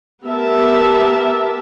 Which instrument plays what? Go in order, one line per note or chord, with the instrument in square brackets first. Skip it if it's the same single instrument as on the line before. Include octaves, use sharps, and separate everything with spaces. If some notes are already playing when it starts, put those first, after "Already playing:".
[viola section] B3 G4 A#4 E5 A5